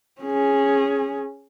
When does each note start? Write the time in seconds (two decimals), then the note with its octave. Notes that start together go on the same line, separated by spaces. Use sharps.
0.22 C#4 G#4